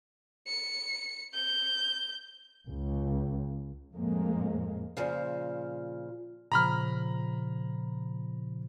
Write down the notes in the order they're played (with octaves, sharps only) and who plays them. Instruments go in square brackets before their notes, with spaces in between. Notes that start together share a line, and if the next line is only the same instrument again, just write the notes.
[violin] C#7
G6
[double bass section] C#2
F2 A2 G#3 A#3
[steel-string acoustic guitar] A#2 C#3 F3
[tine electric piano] A#2 C#3 F3 [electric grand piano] A#5 B5 F6